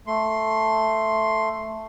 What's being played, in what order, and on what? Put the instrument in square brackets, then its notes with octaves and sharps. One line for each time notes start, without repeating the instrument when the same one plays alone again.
[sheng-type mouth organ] A3 C6